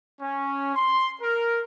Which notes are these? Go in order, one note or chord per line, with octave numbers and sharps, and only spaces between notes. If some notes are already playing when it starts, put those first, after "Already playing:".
C#4
C6
A#4